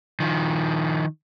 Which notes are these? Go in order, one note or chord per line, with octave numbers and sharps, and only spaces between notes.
D#3 F3